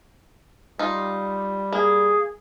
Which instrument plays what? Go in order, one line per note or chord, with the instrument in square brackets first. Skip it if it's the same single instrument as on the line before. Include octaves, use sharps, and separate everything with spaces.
[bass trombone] G3 [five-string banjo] D#4 F4
[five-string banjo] A#3 [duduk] G#4